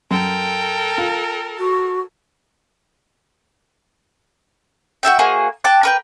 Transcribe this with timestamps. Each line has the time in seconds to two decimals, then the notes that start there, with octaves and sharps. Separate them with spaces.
0.11 F#2 A4 A#4 G5
0.98 F4
1.59 F#4
5.03 F#4 A4 E5 G5
5.19 A#3 C4 F#4 G#4
5.64 G5 A5 D6 F#6
5.83 A#4 B4 G5